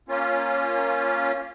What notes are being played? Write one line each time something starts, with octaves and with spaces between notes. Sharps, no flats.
A#3 C#4 F4